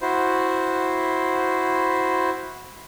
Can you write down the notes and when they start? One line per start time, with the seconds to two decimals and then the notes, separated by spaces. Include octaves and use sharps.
0.01 E4 F#4 C5